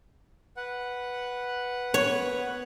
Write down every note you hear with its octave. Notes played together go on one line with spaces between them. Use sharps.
B4 F#5
B3 C#5